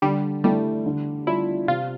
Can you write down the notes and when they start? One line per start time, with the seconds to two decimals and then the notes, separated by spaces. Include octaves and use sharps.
0.02 D3 G3
0.44 G3 A3 E4
0.86 D3
1.27 G3 D4 E4 F4
1.68 C3 F4